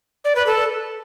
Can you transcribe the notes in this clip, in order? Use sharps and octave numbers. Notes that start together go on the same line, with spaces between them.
D5
B4
A4